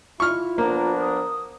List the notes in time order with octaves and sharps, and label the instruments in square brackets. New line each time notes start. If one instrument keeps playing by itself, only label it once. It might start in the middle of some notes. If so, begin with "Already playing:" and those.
[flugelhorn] E4 [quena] F4 [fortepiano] C#6 F6
[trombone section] F3 B3 D4 [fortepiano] A#3 [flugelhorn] A#4
[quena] D#6